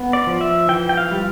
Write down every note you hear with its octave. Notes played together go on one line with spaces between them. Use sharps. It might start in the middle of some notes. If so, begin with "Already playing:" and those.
Already playing: B3
D5
F3
E5
E3 G5
G5
F5
G3